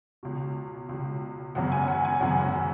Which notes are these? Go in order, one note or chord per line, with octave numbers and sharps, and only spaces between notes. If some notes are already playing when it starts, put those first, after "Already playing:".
C#2 B2
C#2 B2
G#1 F#2 C#3 F#5
G#5
F#5
G#5
G#1 F#2 C#3 F#5